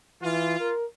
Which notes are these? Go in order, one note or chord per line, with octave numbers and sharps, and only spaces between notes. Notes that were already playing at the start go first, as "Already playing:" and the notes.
E3 F4
A#4